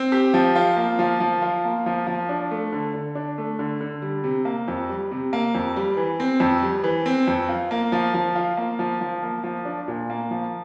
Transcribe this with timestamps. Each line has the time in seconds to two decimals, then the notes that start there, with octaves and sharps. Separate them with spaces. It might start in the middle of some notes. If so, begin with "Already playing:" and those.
Already playing: C4
0.12 G4
0.34 F3
0.56 F4
0.77 A#3
0.99 F3
1.20 F3
1.42 F4
1.64 A#3
1.86 F3
2.07 F3
2.29 D4
2.51 A3
2.72 D3
2.94 D3
3.15 D4
3.38 A3
3.59 D3
3.81 D3
4.02 G3
4.24 C3
4.45 A#3
4.68 F2
4.89 G3
5.11 C3
5.33 A#3
5.55 F2
5.76 G3
5.97 E3
6.20 C4
6.40 F2
6.63 G3
6.84 E3
7.06 C4
7.27 F2
7.49 F4
7.71 A#3
7.92 F3
8.14 F3
8.35 F4
8.57 A#3
8.79 F3
9.01 F3
9.23 A#3
9.44 F3
9.65 D4
9.88 A#2
10.10 A#3
10.31 F3